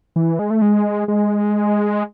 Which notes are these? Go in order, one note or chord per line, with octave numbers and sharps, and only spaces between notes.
E3
G#3
A3
G#3
G#3